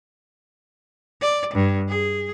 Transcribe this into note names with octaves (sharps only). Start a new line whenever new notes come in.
D5
G2
G#4